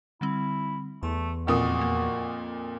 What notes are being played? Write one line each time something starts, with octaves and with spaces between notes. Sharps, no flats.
D3 G3 C4 E4
E2 A3 C6
F2 A#2 F#4 D#6
A#3